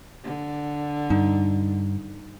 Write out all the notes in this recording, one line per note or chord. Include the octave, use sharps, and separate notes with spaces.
D3
G2 D#4